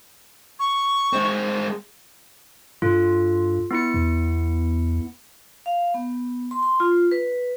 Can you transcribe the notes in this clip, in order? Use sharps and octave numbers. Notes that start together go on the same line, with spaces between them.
C#6
G#3 C4
G2 F4 A4
B3 E4 C#7
E2
F5
B3
C6
C6
F4
B4